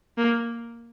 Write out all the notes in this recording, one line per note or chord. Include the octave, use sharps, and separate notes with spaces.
A#3